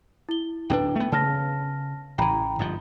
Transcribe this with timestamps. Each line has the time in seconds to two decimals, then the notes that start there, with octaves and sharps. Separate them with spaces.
0.29 E4 G7
0.70 D1 C#4 D4 B4 G5
0.96 A3 B3
1.12 C#3 A5 F6 A#6
2.18 A1 E3 G5 A#5 B5
2.59 G1 G#2 F3